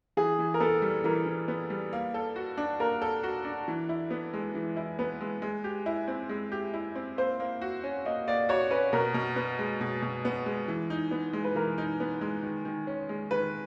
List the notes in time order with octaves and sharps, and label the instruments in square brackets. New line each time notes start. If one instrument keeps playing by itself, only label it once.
[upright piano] E3 [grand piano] G#4
[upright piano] E3
[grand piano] A#4
[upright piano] B3 [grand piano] A4
[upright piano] G3
[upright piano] E3 [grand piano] A#4
[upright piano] E3
B3
G3
A#3
A4
F#4
D4
[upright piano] A#3 [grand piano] A#4
[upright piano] A4
F#4
D4
E3
E4
B3
G#3
E3
E4
[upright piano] B3 [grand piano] B4
[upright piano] G#3
G#3
G4
E4
C4
G#3
G4
E4
C4
[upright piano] A#3 [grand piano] C5
[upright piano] A#3
F#4
C#4
[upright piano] A#3 [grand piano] D#5
[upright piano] A#3 [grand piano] D5
[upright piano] F#4 [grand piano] C#5
[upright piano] C#4 [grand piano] B4
[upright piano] B2 [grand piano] A#4
[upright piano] B2
B3
G#3
B2
B2
B3
G#3
E3
D#4
B3
G#3
[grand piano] B4
[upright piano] E3 [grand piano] A#4
[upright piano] D#4
B3
G#3
D#3
D#3
C#4
G#3
[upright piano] D#3 [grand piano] B4